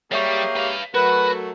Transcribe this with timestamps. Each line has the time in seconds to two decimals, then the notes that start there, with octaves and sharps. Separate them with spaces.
0.12 G3 A#3 G4 G#4 C#5 E5 C#6
0.56 B4 F5
0.94 F#3 A3 F#4 A#4 B4